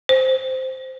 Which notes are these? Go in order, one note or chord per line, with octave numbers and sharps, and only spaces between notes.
C5